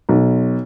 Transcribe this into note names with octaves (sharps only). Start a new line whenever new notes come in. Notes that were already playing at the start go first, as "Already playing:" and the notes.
B1